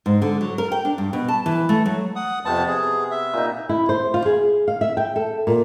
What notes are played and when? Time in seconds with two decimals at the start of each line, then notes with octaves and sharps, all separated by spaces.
0.06 G#2
0.22 D3
0.41 F#3
0.58 A#4
0.72 G5
0.85 D4
0.98 G2
1.13 B2
1.28 A5
1.46 E3
1.69 A3
1.86 F#3
2.16 F#5 D#6
2.45 F2 C3 B3 A5
2.68 G#4
3.11 E5
3.33 A#2 D#4
3.69 E4
3.89 C5
4.14 F4
4.26 G#4
4.68 F5
4.81 E5
4.97 G5
5.16 A4
5.47 A#2